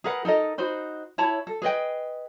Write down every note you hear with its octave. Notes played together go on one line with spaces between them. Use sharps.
G#4 A#4 B4 F#5
D#4 A4 A#4 D#5
D#4 F#4 C5 B5
E4 C#5 A5 B5
A4
G#4 B4 D#5 G5